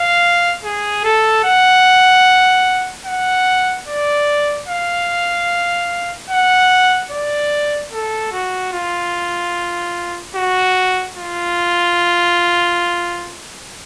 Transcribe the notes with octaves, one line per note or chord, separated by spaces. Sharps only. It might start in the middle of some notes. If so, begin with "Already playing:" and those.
Already playing: F5
G#4
A4
F#5
F#5
D5
F5
F#5
D5
A4
F#4
F4
F#4
F4